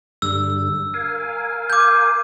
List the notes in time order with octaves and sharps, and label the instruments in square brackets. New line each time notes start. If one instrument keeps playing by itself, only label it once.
[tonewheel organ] G2 D3 G3 [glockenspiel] E6
[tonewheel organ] A#4 F5 G#5
[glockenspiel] D6 G6